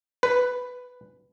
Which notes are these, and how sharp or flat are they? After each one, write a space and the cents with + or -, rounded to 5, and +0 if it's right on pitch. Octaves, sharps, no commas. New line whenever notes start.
B4 +5